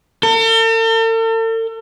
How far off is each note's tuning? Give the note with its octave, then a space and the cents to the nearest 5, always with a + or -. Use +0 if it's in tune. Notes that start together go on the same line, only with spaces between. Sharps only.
A4 +45